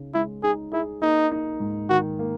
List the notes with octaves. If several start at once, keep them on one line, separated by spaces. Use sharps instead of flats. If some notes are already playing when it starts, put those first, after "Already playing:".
Already playing: C#3 D#4
G#3 E4
D#4 G#4
E4 G#4
A#3 D#4
D#4
G#2
D#3 F#4
A#3